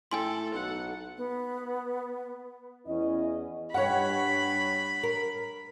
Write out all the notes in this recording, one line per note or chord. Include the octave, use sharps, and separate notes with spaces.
A2 A4 G5 G#5 C6
B1 F#5
B3
E2 C#4 E4 D#5
G2 C#5 F#5 B5
A#4